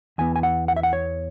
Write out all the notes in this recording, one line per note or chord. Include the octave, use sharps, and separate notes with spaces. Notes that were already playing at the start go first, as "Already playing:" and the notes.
E2 E3 B3 G#5
G#5
F#5
F#5
E5
F#5
C#5